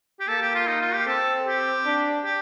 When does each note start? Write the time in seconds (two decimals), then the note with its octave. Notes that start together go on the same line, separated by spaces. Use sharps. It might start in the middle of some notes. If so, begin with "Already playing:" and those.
0.20 G4
0.28 A#3 A4
0.42 G4
0.55 F4
0.67 D#4
0.81 F4
0.93 G4
1.07 C4 A4
1.46 G4
1.86 D4
2.24 G4